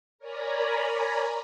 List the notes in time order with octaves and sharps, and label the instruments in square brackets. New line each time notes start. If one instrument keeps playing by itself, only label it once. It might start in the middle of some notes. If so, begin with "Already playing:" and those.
[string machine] A#4 C#5 D5 G#5 A#5 B5